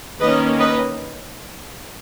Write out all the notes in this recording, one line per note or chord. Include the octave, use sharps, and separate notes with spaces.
D#3 A#3 C#4 B4 D#5
B4 D#5